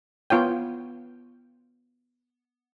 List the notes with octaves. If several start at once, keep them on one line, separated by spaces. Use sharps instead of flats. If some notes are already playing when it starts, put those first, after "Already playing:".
B3 F4 C#5 G5